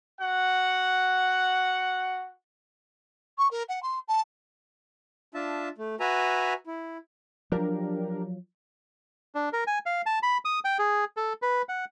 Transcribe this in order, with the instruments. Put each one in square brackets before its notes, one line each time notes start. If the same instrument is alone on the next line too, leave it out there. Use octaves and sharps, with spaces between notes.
[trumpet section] F#4 F#5
[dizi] C#6
A#4
F#5
C6
A5
[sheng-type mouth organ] D4 F4 E5 A5
A3
F#4 B4 E5 G#5 A#5
E4
[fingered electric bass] F3 F#3 [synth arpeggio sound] D4 G4 A#4
[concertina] D4
A#4
G#5
F5
A5
B5
D#6
G5
G#4
A4
B4
F#5